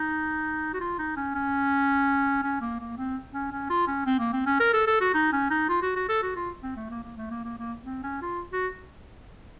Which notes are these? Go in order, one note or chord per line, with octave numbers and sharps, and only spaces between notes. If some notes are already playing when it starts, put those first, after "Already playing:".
Already playing: D#4
F#4
F4
D#4
C#4
C#4
C#4
A#3
A#3
C4
C#4
C#4
F4
C#4
C4
A#3
C4
C#4
A#4
A4
A4
F#4
D#4
C#4
D#4
F4
F#4
F#4
A4
F#4
F4
C4
A3
A#3
A#3
A3
A#3
A#3
A#3
C4
C#4
F4
F#4